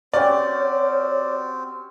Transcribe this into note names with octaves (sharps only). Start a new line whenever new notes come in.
C4 C#4 F#4 G4 C#5 D5